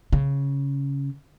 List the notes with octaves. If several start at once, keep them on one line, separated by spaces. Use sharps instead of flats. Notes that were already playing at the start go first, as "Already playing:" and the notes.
C#3